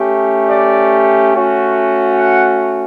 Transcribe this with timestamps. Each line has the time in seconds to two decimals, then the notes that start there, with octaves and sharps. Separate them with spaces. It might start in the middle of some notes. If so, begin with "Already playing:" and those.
Already playing: A3 C#4 G4
0.49 D5
1.33 A3 C#4 F#4
2.16 F#5